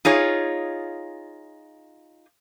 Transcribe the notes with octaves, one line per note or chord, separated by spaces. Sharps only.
D#4 F4 G#4 C#5